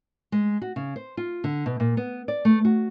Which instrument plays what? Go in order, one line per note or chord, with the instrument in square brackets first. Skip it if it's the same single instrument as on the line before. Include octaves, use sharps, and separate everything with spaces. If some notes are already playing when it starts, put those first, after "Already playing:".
[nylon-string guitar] G#3
F#4
C#3
C5
F4
D3
B2
A#2
B3
D5
A3
F#4